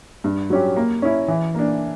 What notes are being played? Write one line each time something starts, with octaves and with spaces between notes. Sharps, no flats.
G2
F#3 C#4 G4
A#3
C#4 E4
E3
A#3 D4